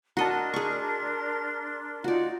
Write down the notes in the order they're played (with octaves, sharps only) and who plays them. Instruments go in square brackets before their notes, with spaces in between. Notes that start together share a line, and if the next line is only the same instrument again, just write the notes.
[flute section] D4 A#4 C6 [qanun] F#4 D#5 [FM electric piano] A5 A#5
[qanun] G#4 C#6
[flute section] D#4 [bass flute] F4 [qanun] F#4 D5